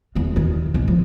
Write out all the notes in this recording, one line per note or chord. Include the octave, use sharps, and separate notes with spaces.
E2 E3
D#2 D#3
B1 G#2
F3